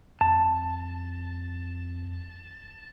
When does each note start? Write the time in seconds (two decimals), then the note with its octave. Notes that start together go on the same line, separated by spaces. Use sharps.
0.21 F2 A5